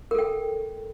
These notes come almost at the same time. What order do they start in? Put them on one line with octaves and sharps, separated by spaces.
A#4 A4 G5